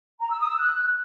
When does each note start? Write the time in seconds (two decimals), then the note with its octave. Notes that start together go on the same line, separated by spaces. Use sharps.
0.20 A#5
0.30 E6
0.39 D#6
0.49 E6
0.58 F#6